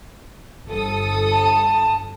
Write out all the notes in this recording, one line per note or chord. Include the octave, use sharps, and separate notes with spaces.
G1 A4 D#6
A5